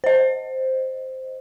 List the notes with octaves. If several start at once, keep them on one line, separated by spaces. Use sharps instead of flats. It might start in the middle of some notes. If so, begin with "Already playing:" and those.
C5 D#5